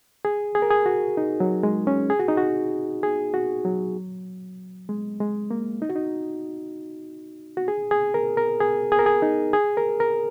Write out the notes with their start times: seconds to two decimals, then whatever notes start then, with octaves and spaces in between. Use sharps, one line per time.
0.25 G#4
0.55 G#4
0.62 A#4
0.71 G#4
0.86 F#4
1.17 D#4
1.40 F#3
1.63 G#3
1.87 C#4
2.10 G#4
2.19 F#4
2.28 D#4
2.37 F#4
3.03 G#4
3.34 F#4
3.65 F#3
4.89 G#3
5.20 G#3
5.51 A#3
5.82 D#4
5.89 F#4
5.96 D#4
7.57 F#4
7.68 G#4
7.91 G#4
8.14 A#4
8.37 A#4
8.60 G#4
8.92 G#4
8.99 A#4
9.06 G#4
9.22 D#4
9.53 G#4
9.77 A#4
10.00 A#4